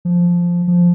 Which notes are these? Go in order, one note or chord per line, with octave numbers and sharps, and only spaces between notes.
F3
F3